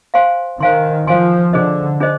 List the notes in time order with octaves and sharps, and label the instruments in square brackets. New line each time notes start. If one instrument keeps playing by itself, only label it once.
[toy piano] C5 F5 G#5 C6
[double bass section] D#3 [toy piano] C5 F5 G#5 C6
[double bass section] F3 [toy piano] C5 F5 G#5 C6
[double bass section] D3 [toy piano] D4 G#4 C5 D#5
[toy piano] D4 G#4 C5 D#5